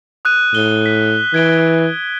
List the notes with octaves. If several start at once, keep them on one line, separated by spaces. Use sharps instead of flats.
D#6 F#6 D#7
A2 G7
B6
E3 G#6 D7 G7